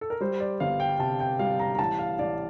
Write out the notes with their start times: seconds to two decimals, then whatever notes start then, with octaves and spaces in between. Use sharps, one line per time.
0.01 A4
0.10 A#4
0.21 G3 C5
0.40 D5
0.60 G1 F5
0.80 G5
0.99 C3 A5
1.20 G5
1.39 G3 F5
1.60 A#5
1.75 A#5
1.79 A1 A5
1.99 F5
2.19 A1 D5